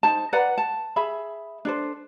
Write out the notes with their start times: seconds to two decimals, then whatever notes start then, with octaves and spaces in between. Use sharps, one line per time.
0.03 D#4 C5 A5
0.33 B4 D5 F#5 A#5
0.58 A5
0.96 G#4 E5 B5
1.65 D4 A4 C5